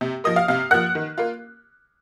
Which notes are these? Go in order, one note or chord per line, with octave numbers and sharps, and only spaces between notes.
C3
F3 A#3 D#5 D#6
F5 F6
C3 F5 F6
F3 A#3 F#5 F#6
D#3
A#3 F4